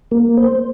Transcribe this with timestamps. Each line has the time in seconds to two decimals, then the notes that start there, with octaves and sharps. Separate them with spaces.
0.11 A#3
0.37 C5